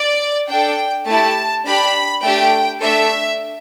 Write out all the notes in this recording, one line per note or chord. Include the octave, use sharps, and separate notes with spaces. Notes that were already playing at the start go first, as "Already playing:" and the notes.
Already playing: D5
D4 A4 G5
A3 E4 G4 A5
D4 G4 B5
A3 D4 G4 G5
A3 D4 A4 E5